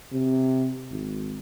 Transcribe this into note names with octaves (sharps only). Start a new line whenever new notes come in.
C3
G#1